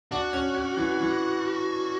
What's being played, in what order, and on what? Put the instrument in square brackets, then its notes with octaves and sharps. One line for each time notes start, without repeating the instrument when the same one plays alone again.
[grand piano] D4 [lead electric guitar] F#4
[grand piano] C#4
C#4
E3
E3